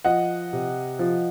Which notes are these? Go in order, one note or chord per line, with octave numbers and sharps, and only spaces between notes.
F3 D#5 F#5
C3
F3